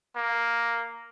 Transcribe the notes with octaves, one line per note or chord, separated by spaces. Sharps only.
A#3